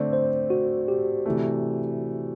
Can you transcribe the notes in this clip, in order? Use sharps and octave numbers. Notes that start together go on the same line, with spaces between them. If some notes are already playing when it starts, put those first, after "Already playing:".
Already playing: D3 A3 C4 D5
C5
F#4
G4
C3 E3 A3